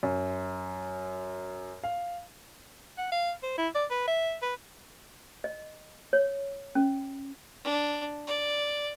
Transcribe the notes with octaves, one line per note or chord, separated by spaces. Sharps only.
F#2
F5
F#5
F5
C5
E4
D5
B4
E5
B4
D#5
C#5
C#4
D4
D5